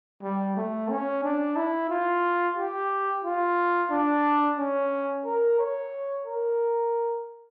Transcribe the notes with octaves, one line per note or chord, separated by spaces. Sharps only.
G3
A3
C#4
D4
E4
F4
G4
F4
D4
C#4
A#4
C#5
A#4